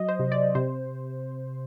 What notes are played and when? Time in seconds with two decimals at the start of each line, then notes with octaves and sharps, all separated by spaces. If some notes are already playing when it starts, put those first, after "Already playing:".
Already playing: F#3 D#5
0.08 C5
0.19 C3
0.32 D5
0.55 C3 C5